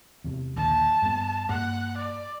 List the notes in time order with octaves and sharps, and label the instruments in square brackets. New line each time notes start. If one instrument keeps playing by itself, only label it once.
[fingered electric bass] E2 C3
[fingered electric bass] A#1 D#2 D3 [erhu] A5
[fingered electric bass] G2 B3
[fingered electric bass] G2 A#3 [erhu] F#5
[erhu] D5